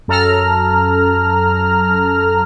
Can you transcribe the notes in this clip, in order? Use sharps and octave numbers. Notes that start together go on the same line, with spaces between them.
F#2 A4 A#5 F6